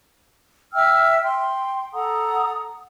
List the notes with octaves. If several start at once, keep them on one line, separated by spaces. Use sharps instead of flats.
E5 G5 E6 F6
G5 C6
A4 F#5 A#5 D#6